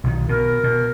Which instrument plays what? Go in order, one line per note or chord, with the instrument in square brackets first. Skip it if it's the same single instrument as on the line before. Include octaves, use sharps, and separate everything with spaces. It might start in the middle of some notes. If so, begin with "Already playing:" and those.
[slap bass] B1 D#3
[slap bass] B2 [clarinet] A#4
[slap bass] B2